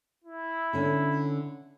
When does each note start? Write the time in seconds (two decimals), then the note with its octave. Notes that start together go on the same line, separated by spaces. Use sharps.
0.24 E4
0.73 D3 C#4